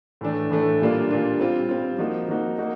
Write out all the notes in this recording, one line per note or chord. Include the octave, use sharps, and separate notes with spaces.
A2 E3 A3 D4
A2 E3 A3 D4
A#2 G3 A#3 D4 F4
A#2 G3 A#3 D4 F4
G3 C4 F4
G3 C4 F4
F3 A#3 D#4 F#4
F3 A#3 D#4 F#4
A#3 D#4 F#4